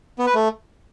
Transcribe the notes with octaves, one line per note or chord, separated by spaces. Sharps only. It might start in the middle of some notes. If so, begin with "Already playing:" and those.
B3
B4
A3